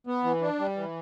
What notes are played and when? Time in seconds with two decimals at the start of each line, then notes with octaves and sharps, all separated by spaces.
0.07 B3
0.24 E3
0.41 D4
0.59 G3
0.76 E3